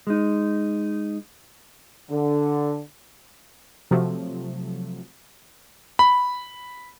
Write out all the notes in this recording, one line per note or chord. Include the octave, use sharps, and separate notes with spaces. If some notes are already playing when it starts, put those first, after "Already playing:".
G#3 D#4
D3
C3 F3 F#3 A3
B5